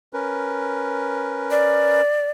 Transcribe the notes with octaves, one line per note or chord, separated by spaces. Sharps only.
C#4 A#4 B4
D5